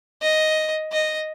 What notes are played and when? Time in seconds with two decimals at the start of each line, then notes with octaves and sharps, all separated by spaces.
0.22 D#5
0.92 D#5